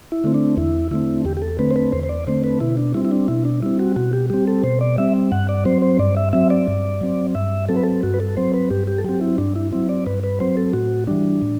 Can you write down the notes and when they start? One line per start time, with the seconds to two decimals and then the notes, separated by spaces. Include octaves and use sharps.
0.12 E4
0.24 D3 A3 C4
0.34 D4
0.57 E2 E4
0.91 D3 A3 C4 E4
1.25 E2 G4
1.37 G4
1.42 A4
1.59 D3 A3 C4 B4
1.71 C5
1.76 B4
1.92 E2 C5
2.03 C5
2.09 D5
2.27 D3 A3 C4 C5
2.44 B4
2.60 B2 E4
2.77 D4
2.94 G3 E4
2.97 C4
3.05 E4
3.11 D4
3.28 B2 E4
3.45 D4
3.62 G3 C4 E4
3.79 F#4
3.96 B2 F#4
4.13 G4
4.30 G3 C4 G4
4.47 A4
4.64 B2 C5
4.81 D5
4.98 G3 C4 E5
5.32 G2 F#5
5.49 D5
5.65 F#3 C4 C5
5.82 C5
5.99 G2 D5
6.17 E5
6.33 F#3 C4 E5
6.50 D5
6.68 G2
7.01 F#3 C4
7.35 G2 E5
7.69 F#3 C4 A4
7.77 B4
7.83 A4
8.03 G2 F#4
8.14 B4
8.20 A4
8.37 F#3 C4 C5
8.54 B4
8.70 G2 G4
8.87 G4
8.98 A4
9.04 F#3 C4 G4
9.21 E4
9.38 G2 D4
9.56 E4
9.72 F#3 C4 E4
9.89 D5
10.06 G2 B4
10.24 B4
10.40 F#3 C4 C5
10.57 A4
10.73 A2 F#4
11.07 E3 G3 D4
11.42 A2